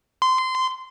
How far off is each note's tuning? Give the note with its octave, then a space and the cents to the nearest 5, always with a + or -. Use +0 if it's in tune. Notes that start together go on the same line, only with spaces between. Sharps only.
C6 -20